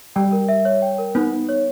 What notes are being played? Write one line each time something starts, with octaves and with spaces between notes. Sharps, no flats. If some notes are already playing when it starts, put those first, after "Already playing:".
G3 G5
A#4
E5
C#5
G5
A#4
B3 D#4
D#4
C#5